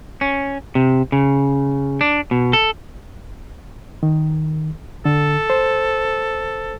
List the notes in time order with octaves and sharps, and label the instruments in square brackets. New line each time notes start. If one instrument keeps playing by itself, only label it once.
[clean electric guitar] C#4
C3
C#3
D4
B2
A4
[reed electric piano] D#3
[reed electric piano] D3 [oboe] A4
[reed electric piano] C5